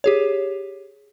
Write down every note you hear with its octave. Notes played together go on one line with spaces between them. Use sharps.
G4 G#4 C#5